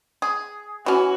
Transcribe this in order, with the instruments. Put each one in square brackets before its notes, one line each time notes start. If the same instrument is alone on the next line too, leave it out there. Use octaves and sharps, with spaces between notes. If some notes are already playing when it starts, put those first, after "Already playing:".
[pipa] G#4
[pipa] E3 C#4 [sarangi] F#4